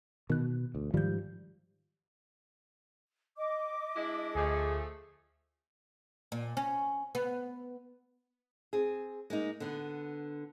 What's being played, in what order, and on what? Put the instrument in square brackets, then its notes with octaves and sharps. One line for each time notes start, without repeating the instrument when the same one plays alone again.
[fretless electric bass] B2 [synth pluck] D#3 F#6
[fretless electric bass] D2
[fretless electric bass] G#2 F3 G3 [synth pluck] D#3 G6
[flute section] D#5 D6
[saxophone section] G#3 D4 E4
[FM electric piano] D2 [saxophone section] F3 A3 [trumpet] G#4
[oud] A#2
C#4
B3
[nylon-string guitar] C4 G#4
G#3 A#3 D#4
D3 B3